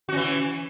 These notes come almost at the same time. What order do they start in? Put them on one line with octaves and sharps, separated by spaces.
F#4 C#4 E3